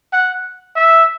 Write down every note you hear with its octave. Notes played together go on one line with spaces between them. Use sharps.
F#5
E5